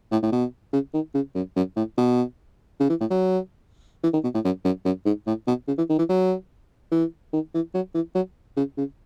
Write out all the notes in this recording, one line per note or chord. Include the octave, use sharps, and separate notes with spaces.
A2
A2
B2
C#3
D#3
C#3
F#2
F#2
A2
B2
C#3
E3
A2
F#3
E3
D#3
B2
A2
F#2
F#2
F#2
G#2
A2
B2
C#3
E3
D#3
E3
F#3
E3
D#3
E3
F#3
E3
F#3
C#3
C#3